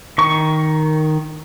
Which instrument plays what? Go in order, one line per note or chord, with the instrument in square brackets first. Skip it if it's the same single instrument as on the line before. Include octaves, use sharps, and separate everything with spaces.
[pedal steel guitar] D#3 C#6